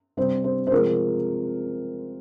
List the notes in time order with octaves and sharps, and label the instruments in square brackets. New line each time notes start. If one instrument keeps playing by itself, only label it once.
[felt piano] C3 G3 C5
C5
C5
C3 F3 G#3 A#4